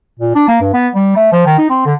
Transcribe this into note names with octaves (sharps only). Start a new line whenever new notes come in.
A#2
D4
A#3
G2
B3
G3
A3
F3
D#3
D#4
C4
D3